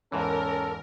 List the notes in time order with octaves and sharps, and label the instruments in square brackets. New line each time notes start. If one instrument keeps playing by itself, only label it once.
[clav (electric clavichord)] E2 G#2 E3 [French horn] C#4 [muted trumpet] A4 [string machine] A#4